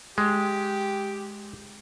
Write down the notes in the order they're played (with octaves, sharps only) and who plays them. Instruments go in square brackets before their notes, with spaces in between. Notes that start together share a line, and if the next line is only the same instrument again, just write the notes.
[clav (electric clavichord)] G#3 [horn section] G4